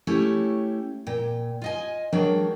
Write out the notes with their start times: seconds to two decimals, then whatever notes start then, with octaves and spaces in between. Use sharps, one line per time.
0.07 A3 C#4 E4 G4 C#5
1.07 A#2 G5
1.62 F4 D#5 G#5
2.13 F#3 G#3 D4 F#4 A#4 G5